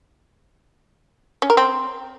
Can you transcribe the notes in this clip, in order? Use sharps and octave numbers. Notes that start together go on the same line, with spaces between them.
C#4
A#4
C4